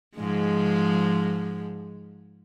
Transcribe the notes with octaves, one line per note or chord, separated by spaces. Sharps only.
G#2 F3 G#3